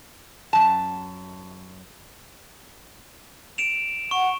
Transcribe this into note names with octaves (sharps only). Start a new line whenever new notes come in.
F#2 A5
D7 E7 F7
F#5 C#6